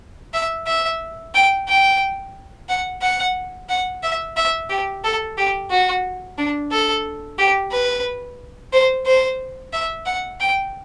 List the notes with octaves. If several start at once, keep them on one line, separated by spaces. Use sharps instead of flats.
E5
E5
G5
G5
F#5
F#5
F#5
E5
E5
G4
A4
G4
F#4
D4
A4
G4
B4
C5
C5
E5
F#5
G5